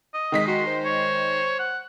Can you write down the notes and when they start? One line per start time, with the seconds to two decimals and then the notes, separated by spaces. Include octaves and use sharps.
0.14 D#5
0.32 D#3 G#3 B6
0.47 F#4 C6
0.67 C5
0.85 C#5
1.59 F#5